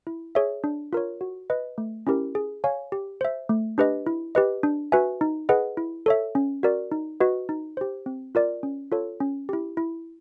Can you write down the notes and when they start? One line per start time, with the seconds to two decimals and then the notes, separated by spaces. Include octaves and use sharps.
0.07 E4
0.35 G#4 C#5 E5
0.64 D4
0.93 F4 A#4 C#5
1.21 F#4
1.50 B4 D#5
1.78 A3
2.07 C#4 E4 G4 A#4
2.35 G#4
2.64 C#5 F5 G#5
2.92 G4
3.21 C5 E5
3.49 A3
3.78 D4 G4 B4 D#5
4.06 E4
4.35 G4 B4 D#5
4.63 D4
4.92 F#4 B4 E5 G#5
5.21 D#4
5.49 G#4 B4 D#5 F#5
5.77 E4
6.06 A4 C#5 E5
6.35 C#4
6.63 F#4 A#4 D5
6.92 D#4
7.20 F#4 B4 D#5
7.49 D#4
7.77 G4 C5
8.06 C4
8.35 F4 A#4 D5
8.63 C#4
8.92 F4 A4 C#5
9.20 C#4
9.49 E4 G4
9.77 E4